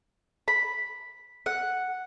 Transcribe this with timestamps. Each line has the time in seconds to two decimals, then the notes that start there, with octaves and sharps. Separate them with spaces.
0.48 B5
1.46 F#5